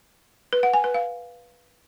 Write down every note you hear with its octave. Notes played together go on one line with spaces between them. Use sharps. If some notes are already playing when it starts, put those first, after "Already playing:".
B4
F#5
G#5
B4
F5